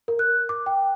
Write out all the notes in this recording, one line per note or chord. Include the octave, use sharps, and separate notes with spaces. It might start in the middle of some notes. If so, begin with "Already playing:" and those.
A#4
F#6
D6
G5